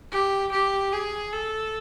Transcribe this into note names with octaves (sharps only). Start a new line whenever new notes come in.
G4
G4
G#4
A4